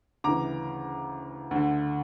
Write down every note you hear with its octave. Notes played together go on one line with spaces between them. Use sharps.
D2 C#3 E3 A#5 D6
D2 D3